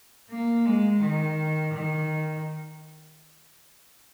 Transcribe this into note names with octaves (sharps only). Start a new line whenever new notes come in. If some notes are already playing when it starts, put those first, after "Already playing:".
A#3
G#3
D#3
D#3